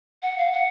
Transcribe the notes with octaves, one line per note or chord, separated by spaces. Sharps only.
F#5
F5
F#5